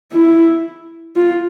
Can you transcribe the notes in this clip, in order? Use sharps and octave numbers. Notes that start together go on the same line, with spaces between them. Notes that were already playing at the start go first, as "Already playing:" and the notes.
E4
F4